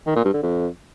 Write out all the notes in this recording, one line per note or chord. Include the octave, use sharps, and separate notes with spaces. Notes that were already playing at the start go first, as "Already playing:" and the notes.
D#3
A#2
G2
D3
F2